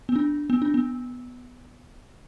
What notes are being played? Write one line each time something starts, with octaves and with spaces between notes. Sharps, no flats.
B3
D4
B3
D4
B3